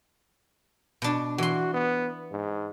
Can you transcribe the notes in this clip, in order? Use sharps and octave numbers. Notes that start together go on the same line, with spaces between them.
B2 D4
E3 F#4 C6
B3
G#2